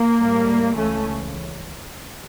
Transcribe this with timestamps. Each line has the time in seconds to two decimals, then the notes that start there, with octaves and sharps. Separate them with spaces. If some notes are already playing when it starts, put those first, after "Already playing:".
Already playing: A#3
0.19 A2 G3
0.75 C#2 C#3 E3 A3 C#4